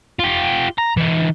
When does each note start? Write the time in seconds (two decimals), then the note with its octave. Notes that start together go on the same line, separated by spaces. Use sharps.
0.20 F4 G4
0.78 A#5
0.97 E3 D#4